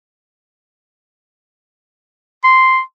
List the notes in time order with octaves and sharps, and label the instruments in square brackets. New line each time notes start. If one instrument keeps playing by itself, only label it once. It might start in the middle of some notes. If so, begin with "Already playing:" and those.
[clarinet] C6